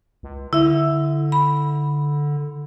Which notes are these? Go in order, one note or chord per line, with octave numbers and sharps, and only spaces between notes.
C#2
D3 E4 E5
B5